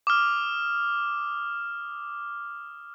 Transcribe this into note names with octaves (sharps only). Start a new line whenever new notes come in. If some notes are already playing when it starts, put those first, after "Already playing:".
D6 D#6 F6